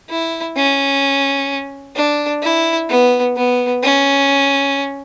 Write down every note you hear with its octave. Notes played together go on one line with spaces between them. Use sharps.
E4
C#4
D4
E4
B3
B3
C#4